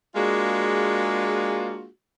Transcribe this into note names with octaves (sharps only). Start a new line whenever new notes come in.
G#3 A#3 D4 F4 F#4 G#4